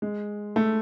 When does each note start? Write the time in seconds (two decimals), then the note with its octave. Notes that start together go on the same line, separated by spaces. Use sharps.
0.02 G#3
0.56 A3